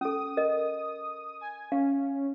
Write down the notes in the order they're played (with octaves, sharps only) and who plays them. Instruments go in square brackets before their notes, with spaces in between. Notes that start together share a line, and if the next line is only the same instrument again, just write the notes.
[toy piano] C#4 A4 [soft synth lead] D#6
[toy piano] A#4 D#5
[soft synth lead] G#5
[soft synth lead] C#4 [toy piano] F5